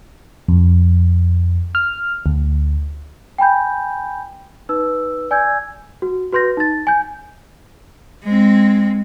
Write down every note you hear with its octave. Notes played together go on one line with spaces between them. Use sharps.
F2
F6
D2
G5 G#5 B5 G6
D#4 B4 E6
D5 G#5 E6 G6 G#6
F#4
F#4 B4 C6 G6 A#6
D#4 A6
G#5 G6
G#3 C4